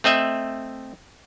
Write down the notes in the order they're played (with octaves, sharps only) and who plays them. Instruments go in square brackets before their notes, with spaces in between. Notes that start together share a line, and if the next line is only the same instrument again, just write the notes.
[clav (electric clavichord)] A3 C4 D#5 E5